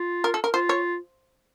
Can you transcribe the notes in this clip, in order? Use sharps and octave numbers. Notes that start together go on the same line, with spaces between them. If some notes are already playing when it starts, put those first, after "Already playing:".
Already playing: F4
A#4
A4
A#4
F4 C5
C#5